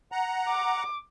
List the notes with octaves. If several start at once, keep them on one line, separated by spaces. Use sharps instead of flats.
F#5 A#5
D6